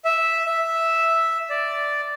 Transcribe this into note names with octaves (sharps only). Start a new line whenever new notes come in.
E5
E5
D5